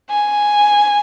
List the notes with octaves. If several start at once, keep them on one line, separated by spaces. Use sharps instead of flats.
G#5